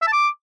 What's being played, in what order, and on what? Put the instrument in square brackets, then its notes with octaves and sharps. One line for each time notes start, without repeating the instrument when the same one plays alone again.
[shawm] E5
A5
D6